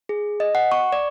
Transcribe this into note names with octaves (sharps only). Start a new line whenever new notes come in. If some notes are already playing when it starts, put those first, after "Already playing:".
G#4
D#5
F#5
C#6
D5